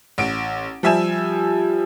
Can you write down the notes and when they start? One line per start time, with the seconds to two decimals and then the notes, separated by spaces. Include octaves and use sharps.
0.18 A1 D7
0.83 F3 G3 E5 G#5 E7